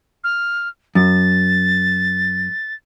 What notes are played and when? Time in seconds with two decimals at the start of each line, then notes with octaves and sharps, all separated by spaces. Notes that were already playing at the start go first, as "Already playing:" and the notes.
0.24 F6
0.95 F#2 A6